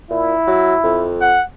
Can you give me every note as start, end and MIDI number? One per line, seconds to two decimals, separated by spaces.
0.11 0.33 46
0.11 1.09 64
0.47 0.74 54
0.84 1.38 41
1.21 1.43 78